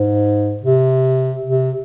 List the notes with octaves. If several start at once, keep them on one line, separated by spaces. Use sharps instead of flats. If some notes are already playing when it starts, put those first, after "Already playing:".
Already playing: G#2
C3
C3